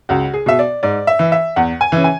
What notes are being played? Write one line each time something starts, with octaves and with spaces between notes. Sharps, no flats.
C#2 F#4
G#4
B2 E5
D5
G#2 D5
E5
E3
E5
E2 F#5
G#5
C#3 E3
G#5